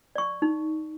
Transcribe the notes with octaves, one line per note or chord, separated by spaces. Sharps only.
D5 C#6
D#4